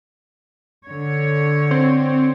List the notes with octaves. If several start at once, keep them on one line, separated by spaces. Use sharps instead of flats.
D3 C#5
C4